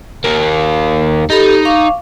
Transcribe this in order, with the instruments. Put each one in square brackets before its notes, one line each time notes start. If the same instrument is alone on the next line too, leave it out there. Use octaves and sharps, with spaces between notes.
[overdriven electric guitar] D#2 A#3
[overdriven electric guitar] D#4 [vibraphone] G4 A4 B5
[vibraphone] F5 C#6 D6